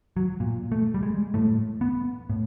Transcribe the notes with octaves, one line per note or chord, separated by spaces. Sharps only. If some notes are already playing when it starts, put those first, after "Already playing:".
F#3
A#2
A3
G3
G#3
A2 A3
B3
A2